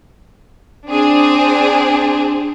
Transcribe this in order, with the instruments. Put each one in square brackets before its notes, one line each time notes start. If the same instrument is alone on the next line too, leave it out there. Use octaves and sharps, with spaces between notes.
[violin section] C4 D4 G#4